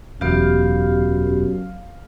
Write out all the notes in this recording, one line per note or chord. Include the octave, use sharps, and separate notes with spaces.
E1 F#2 B3 G4 F5